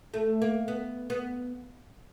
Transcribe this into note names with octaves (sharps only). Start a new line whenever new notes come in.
A3
A#3
B3
B3